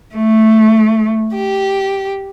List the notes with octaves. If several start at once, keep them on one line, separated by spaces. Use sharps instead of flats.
A3
G4